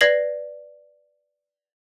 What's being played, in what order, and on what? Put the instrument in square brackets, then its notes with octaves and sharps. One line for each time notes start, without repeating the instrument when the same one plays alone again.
[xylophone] B4 D5 G#6 A#6 C7 F#7